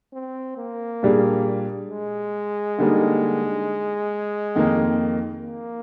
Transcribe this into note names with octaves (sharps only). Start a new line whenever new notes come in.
C4
A#3
A#2 G3 D4 G#4
G#3
D3 G3 A#3 D#4
F2 D#3 A#3 D#4
A#3